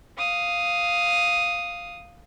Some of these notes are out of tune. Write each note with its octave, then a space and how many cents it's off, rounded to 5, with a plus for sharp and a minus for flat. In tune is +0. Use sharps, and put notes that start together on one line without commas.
F5 +0 D#6 +0